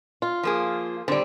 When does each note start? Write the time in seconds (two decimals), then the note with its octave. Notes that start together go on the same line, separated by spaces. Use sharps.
0.22 F4
0.43 F3 A#3 G#4
1.08 D3 G3 C4